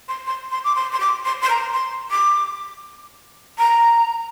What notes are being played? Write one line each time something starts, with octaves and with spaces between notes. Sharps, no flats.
C6
C6
C6
D6
C6
C6
D6
C6
C6
A#5
C6
D6
A#5